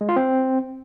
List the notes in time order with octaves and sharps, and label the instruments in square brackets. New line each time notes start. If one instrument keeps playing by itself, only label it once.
[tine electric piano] G#3
F4
C4